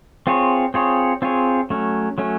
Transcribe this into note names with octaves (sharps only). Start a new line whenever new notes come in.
C4 F4 G#4 C#5
C4 F4 G#4 C#5
C4 F4 G#4 C#5
F#3 A3 C#4
F#3 A3 C#4